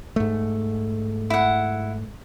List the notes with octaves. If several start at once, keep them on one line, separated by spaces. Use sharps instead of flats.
G#2 A3
E4 F#5